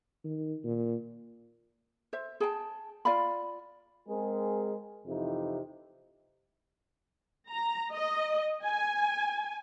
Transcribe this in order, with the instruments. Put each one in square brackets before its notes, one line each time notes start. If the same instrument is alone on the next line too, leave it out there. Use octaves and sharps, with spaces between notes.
[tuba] D#3
A#2
[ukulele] C5 E5
G#4 G5 A5
F4 D5 F5 B5
[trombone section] G#3 C4 G#4 A#4
F2 C3 E3 D#4
[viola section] A#5
D#5
G#5